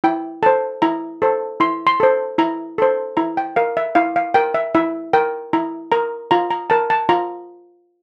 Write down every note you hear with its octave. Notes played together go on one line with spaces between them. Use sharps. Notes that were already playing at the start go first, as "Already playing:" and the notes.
E4 G5
A4 C5 A5
E4 A#5
A4 C5
E4 C6
C6
A4 C5
E4 A#5
A4 C5
E4 A#5
G5
A#4 F5
E5
E4 F5
F5
A#4 G5
E5
E4 E5
A#4 G5
E4 A#5
A#4 A#5
F4 A#5
A#5
A#4 A5
A5
F4 A#5